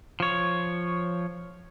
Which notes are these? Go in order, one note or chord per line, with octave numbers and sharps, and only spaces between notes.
F3 C#5